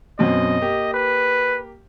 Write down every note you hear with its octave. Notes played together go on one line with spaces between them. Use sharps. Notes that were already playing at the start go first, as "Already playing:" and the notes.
F#2 B2 C4 D#5
A#3 G4
B4